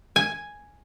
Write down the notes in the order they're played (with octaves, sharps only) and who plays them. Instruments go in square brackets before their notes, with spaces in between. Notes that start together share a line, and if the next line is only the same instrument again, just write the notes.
[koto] G#5